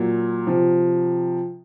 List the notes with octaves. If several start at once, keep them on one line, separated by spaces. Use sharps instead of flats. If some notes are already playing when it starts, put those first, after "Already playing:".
Already playing: A#2 F#3
C3 F3